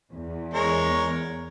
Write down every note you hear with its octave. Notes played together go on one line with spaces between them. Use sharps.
E2
G#3 A#4 C#5